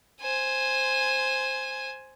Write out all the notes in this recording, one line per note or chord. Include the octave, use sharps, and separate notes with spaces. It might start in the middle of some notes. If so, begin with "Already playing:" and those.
C5 G#5